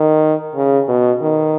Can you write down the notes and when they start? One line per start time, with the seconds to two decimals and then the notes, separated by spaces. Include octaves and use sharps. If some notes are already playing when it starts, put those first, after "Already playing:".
Already playing: D#3
0.56 C#3
0.88 B2
1.22 D#3